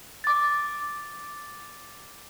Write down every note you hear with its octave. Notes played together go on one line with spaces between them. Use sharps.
D6 A6